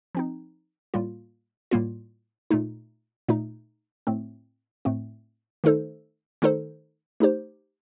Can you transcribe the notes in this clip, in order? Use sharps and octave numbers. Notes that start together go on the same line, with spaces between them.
F3 C4 D#4
A2 G3 A#3 F4
A2 G3 A#3 F4
A#2 A3 D#4
A#2 A3 D#4
A2 A3 C4
A2 A3 C4
D#3 A3 D#4 A4 C5
D#3 A3 D#4 A4 C5
A3 D#4 G4 C5